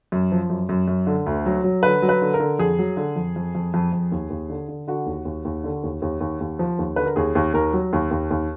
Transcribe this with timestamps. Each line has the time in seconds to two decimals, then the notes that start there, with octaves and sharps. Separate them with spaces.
0.12 F#2
0.32 F3
0.50 F#2
0.69 F#2
0.88 F#2
1.07 D3
1.26 D2
1.46 F#3
1.64 F#3
1.83 D3 B4
2.02 F#3
2.09 B4
2.22 D3
2.34 A#4
2.40 D3
2.59 F2 G#4
2.79 F#3
2.97 D3
3.16 F2
3.36 F2
3.55 F2
3.74 F2
3.93 F2
4.12 D#2
4.30 D#2
4.50 D3
4.68 D3
4.88 D3 F#4
5.06 D#2
5.25 D#2
5.45 D#2
5.64 D3
5.83 D#2
6.02 D#2
6.21 D#2
6.41 D#2
6.59 F3
6.79 D#2
6.96 D3 B4
7.06 A#4
7.16 D#2 G#4
7.35 D#2
7.54 D#2 A#4
7.73 F#3
7.93 D#2
8.11 D#2
8.30 D#2